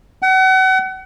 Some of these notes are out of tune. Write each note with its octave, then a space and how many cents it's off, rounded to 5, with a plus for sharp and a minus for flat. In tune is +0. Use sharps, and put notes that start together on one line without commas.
F#5 +35